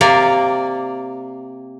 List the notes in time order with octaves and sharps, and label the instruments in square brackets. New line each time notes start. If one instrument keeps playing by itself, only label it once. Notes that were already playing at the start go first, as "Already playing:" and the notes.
[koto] C3 A#3 D5